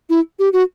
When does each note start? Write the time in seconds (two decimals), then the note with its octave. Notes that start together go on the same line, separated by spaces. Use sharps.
0.10 E4
0.39 G4
0.53 F#4